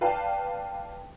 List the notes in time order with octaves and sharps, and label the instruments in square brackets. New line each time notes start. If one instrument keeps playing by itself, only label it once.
[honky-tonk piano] B4 D5 F5 G5 A5